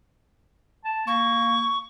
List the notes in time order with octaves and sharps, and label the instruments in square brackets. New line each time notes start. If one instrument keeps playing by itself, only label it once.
[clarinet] A5
[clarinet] A#3 [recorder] C#6